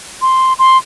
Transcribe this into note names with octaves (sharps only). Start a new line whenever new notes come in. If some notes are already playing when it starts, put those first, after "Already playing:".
C6
C6